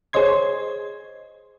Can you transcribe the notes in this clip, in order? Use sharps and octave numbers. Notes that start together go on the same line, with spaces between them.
G#4 C5 C#5 D#5 C6 G#6